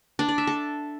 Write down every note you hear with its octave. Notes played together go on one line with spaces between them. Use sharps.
D4
D5
E5
A4